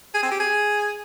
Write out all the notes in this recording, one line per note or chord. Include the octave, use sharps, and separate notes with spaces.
G#4
C4
G4
G#4